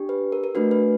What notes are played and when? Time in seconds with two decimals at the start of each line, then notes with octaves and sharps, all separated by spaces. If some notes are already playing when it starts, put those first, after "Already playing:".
Already playing: D4 G4
0.09 B4
0.32 A#4
0.44 A#4
0.55 A3 D4 F#4 B4
0.71 B4